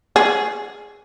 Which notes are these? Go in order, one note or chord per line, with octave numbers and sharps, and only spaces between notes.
G#4